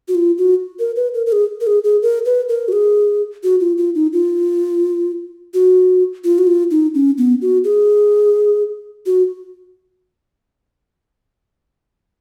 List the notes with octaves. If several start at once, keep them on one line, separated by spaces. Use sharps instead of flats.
F#4
F4
F#4
A#4
B4
A#4
A#4
G#4
A#4
G#4
G#4
A#4
B4
A#4
F#4
G#4
F#4
F4
F4
D#4
F4
F#4
F4
F#4
F4
D#4
C#4
B3
F#4
G#4
F#4